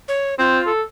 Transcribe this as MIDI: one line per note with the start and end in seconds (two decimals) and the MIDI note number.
0.08 0.35 73
0.39 0.59 60
0.39 0.71 65
0.67 0.82 69